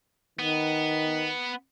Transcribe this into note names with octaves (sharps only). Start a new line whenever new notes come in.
D#3 B3